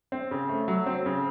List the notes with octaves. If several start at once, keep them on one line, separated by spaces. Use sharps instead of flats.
C4
C#3
A3
F#3
C4
C#3